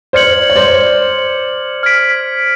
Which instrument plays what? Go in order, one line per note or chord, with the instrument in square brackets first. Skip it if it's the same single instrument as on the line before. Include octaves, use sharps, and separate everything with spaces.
[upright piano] C5 D5 [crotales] F6 G#6 C#7 F#7
[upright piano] C#5
C5 D5
[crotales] F6 G#6 B6 D7